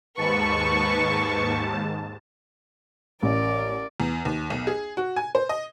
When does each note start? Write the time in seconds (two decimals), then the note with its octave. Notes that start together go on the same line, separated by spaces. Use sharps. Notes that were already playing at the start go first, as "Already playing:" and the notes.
0.17 D#2 G#2 B4 A5 C#6
3.23 A1 A#4 D5
4.00 E2
4.25 D#2
4.50 B1
4.67 G#4
4.97 F#4
5.16 G#5
5.35 C5
5.49 D#5